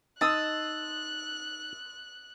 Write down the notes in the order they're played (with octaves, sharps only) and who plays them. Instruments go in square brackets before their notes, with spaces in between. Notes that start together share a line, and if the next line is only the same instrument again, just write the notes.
[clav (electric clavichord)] D#4 [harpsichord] A5 [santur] C6 D#6 E6 [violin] F#6